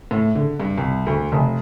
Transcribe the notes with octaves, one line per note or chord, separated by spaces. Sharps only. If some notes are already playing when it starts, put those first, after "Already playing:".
A2
D3
G2
C2
D2
F1